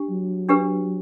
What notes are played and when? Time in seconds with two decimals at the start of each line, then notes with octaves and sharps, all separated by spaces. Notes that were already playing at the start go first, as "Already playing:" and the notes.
Already playing: D4 G4
0.10 F#3
0.49 D4 G4 B4